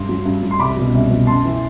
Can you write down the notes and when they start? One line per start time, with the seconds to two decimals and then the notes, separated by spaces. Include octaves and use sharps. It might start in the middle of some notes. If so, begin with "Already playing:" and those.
Already playing: G2 C6
0.09 F#3
0.25 G2
0.43 F#3
0.51 C6
0.60 C2 B5 D6
0.77 B2 F#3
0.93 C2
1.10 B2 F#3
1.27 F#2 A5 C6
1.45 E3